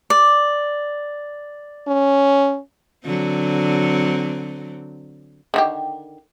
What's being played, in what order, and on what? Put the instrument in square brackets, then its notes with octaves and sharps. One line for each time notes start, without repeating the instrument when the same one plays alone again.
[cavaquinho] D5
[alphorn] C#4
[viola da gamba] D3 F#3 C4
[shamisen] D3 D#3 G4